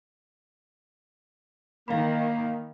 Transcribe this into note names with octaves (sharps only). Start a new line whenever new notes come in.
D#3 A#3 F5 B5